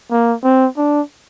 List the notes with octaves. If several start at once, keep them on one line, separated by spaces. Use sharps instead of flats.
A#3
C4
D4